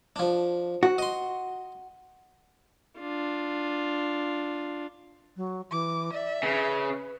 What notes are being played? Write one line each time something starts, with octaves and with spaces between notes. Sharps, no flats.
F3 D4
F#4
D#5 C6
D4 F4
F#3
E3 D6
D5 E5
C#3 B4